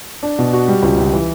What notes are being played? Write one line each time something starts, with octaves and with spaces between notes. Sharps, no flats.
D4
B2
F#4
G3
C#2
C#2
E3